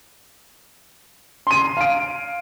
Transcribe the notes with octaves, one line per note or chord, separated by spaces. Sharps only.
C6 D#7
F5 D7